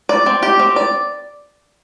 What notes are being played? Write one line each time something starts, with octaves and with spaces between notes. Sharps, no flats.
D5
C4
G4
C4
D5